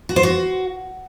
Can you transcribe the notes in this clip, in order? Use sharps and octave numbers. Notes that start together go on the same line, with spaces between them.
F#4
C5
F#4